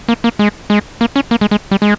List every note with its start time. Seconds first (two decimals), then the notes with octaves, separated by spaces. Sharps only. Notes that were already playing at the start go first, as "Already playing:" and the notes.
0.09 A#3
0.24 A#3
0.39 G#3
0.70 G#3
1.01 A#3
1.16 C#4
1.31 A#3
1.41 G#3
1.51 G#3
1.71 G3
1.82 G#3